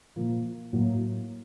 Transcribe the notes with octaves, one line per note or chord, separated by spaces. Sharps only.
A#2 F3 A#3
A2 F#3 A#3